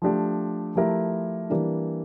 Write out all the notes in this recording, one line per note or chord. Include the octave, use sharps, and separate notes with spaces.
F3 A3 D4 G4
F3 A3 E4 G4 A#4
E3 G3 A#3 D4